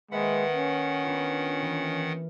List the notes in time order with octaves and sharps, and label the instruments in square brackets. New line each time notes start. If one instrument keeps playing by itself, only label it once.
[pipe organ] D#3 F#5 [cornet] G#3 [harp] A#3 B4 E5
[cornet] C#4
[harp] B3 D4 F4
E3 A#3